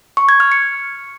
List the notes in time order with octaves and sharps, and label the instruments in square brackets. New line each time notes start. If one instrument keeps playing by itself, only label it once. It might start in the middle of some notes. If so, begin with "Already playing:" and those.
[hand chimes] C#6
G#6
F6
C#7